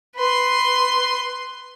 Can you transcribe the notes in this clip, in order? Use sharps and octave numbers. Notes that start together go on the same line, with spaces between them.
B4 C6